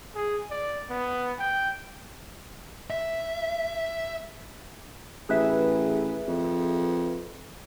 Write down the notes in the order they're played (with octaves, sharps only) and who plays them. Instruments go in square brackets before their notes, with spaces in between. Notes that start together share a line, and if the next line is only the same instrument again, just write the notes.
[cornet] G#4
D5
B3
G5
[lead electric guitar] E5
[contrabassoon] A1 [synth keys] G#4 B4 E5
[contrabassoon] F2